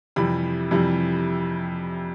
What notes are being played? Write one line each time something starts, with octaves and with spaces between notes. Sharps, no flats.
F2 C3 E3 G3 B5
F2 C3 E3 G3